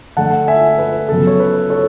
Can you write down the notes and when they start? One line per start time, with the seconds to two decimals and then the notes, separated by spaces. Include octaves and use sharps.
0.17 D3 A3 F#5 A5
0.48 E5 G#5
0.78 B4
1.09 C#3 F#3 B3 A4
1.27 C#5
1.40 B4
1.70 A4 C#5